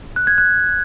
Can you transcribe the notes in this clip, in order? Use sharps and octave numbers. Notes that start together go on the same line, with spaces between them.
F#6
G#6
F#6